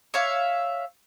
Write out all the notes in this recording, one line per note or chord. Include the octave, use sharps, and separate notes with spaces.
C#5 E5 F5